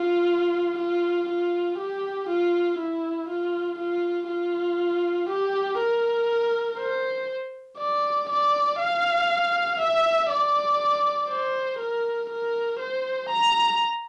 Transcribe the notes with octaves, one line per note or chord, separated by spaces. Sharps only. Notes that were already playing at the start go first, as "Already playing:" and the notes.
Already playing: F4
F4
F4
G4
F4
E4
F4
F4
F4
G4
A#4
C5
D5
D5
F5
E5
D5
C5
A#4
A#4
C5
A#5